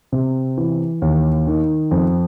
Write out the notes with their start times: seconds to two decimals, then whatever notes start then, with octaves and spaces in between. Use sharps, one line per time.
0.12 C3
0.58 E3
1.02 D#2
1.47 D#3
1.91 F2